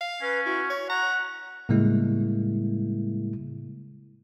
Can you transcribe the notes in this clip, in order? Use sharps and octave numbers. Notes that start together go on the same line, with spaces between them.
F5
C#4 B4
E4 F#4
C#5
F#5 A#5 C#6
A2 C#3 G3 G#3 A#3 E4